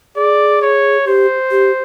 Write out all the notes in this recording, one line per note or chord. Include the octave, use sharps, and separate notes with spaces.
G#4 D5
C#5
G4 C5
G4